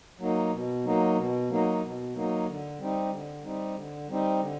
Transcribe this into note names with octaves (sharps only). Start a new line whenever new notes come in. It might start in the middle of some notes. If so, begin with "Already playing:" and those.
F#3 A#3 D#4
B2
F#3 A#3 D#4
B2
F#3 A#3 D#4
B2
F#3 A#3 D#4
D3
G3 C4 D#4
D3
G3 C4 D#4
D3
G3 C4 D#4
D3